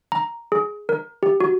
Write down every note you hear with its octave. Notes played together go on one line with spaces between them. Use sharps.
A#5
G#4
A#4
G4
F#4